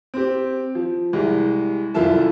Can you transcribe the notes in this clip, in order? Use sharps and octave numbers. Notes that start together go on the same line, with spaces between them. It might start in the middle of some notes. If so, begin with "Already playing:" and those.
C4 G4
F3
C2 G#3 G4
C2 F#2 F4 A4 E5 A5